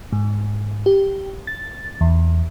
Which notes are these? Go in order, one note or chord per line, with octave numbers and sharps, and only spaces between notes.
G#2
G4
A6
E2